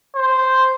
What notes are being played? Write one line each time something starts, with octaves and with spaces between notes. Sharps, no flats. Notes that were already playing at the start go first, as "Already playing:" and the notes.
C5